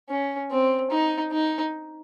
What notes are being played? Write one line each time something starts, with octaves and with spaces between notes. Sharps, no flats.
C#4
C4
D#4
D#4